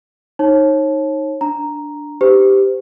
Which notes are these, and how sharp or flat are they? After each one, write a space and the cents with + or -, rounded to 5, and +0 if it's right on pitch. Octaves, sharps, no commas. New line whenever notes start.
D#4 +0 C#5 -30 A5 -25
D4 +0 A#5 +0
D#4 +0 G4 +0 C5 -35